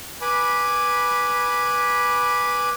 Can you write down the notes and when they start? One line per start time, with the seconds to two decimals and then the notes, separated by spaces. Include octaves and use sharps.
0.22 B4 G#5 B5 D6